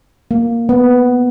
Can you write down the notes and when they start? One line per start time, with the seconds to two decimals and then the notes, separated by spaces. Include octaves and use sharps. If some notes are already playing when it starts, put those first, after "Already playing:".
0.31 A#3
0.69 B3